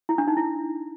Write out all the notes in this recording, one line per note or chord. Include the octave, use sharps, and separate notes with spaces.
E4
D4
D#4
E4